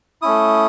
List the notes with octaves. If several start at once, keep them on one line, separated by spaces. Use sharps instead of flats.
A3 C#4 E4 D#6